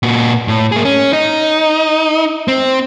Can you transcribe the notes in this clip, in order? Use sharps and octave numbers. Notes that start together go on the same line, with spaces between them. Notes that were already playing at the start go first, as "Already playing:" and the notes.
A#2 F#4
A2
A#3 G#4
C#4
D#4
C4